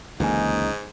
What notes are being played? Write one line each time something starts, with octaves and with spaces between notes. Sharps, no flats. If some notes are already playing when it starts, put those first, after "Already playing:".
C#2 G#2 D3 E3 A#3 D#4 G#5